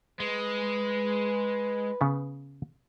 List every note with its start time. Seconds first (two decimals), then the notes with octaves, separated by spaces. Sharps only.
0.20 G#3 B4
2.01 C#3 B3